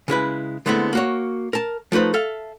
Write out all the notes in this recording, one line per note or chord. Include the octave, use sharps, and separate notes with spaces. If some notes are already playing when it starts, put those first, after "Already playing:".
C#3 G#3 E4 B4
D3 G#3 A3 B3 C4 E4
A#3 F#4 C#5
A#4 A5
F3 A3 D#4 B4 C5
A4 E5 F5